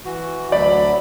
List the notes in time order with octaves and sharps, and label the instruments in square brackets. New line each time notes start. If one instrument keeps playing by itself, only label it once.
[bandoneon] E3 F#4
[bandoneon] D2 F#3 B5 [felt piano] D5